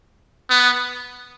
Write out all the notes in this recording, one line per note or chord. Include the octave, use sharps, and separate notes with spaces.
B3